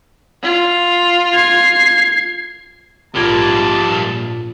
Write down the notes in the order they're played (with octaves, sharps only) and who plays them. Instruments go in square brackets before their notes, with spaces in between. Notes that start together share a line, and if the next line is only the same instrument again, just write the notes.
[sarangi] F4
[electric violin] G#6 C7
[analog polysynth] A#1 [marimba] G#2 F4 G#6 [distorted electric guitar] G3 A#3 [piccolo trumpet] A5